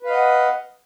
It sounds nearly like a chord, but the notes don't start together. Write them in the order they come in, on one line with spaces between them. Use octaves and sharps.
B4 F5 D#5 F#5